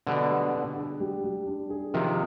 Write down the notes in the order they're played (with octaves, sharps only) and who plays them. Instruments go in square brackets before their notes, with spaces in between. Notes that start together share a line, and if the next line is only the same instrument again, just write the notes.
[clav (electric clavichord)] B2 D3 [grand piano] G3
[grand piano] G3
D4
G#4
G3
G3
D4
G#4
[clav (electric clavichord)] C3 D#3 [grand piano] F3